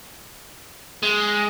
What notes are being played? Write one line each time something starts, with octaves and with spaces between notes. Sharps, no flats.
G#3